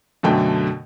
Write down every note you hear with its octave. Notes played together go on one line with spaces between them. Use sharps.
F#2 B2 D3 A3 G5